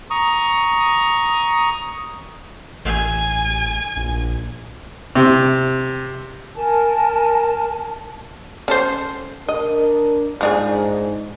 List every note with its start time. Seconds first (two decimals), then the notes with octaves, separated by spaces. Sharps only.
0.10 A#5 C#6 D#6
2.85 A1 G#5
3.97 A#1
5.15 C3
6.56 A#4 G#5 A5
8.68 C#4 A4 C5
9.48 D4 A#4 D#5
10.41 G#2 F3 D4 G#4